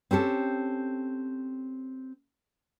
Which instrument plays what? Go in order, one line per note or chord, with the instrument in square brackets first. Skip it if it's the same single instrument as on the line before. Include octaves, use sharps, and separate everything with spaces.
[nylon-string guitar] C4 C#4 G4 A4